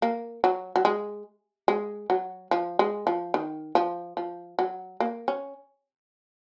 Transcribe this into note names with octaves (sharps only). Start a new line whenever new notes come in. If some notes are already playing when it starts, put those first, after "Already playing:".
A#3
F#3
F#3
G#3
G#3
F#3
F3
G#3
F3
D#3
F3
F3
F#3
A#3
C#4